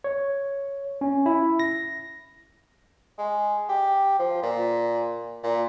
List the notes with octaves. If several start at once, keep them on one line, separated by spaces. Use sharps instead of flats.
C#5
C#4
E4
A#6
G#3
G4
F3
A#2
A#2